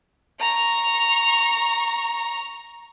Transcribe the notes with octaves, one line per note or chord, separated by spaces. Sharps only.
A#5 C#6